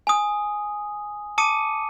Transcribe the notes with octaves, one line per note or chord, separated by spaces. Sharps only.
G#5 D#6
A5 D6 D#6 C#7 D#7